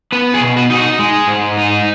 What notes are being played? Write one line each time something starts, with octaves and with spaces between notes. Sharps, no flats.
B3 B4
G#4
B2
F#4
D#4 G#4
F#4
G#3
G#2
D#4